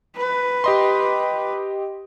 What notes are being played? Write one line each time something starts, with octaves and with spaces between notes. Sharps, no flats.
B4
G4 D#5 C6